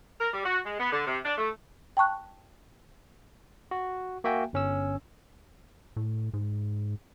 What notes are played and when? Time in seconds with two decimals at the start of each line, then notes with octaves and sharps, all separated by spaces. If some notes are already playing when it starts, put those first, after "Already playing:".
0.21 A#4
0.33 G3
0.46 F#4
0.66 G#3
0.80 B3
0.92 D3
1.07 C3
1.25 D4
1.38 A3
1.97 G5 A5 C#6 F#6
3.71 F#4
4.24 A#3 F#4 E5 G5 G#5
4.53 G1 C#4 E6
5.96 A2
6.34 G#2